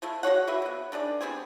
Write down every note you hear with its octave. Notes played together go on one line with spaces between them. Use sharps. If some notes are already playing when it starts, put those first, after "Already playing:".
F3 G#3 A3 E4
F#4 G#4 C#5 F#5
F#4 G#4 B4 E5
C3 B3
D#3 D4 G#4 D5
G3 B3 C4 G#4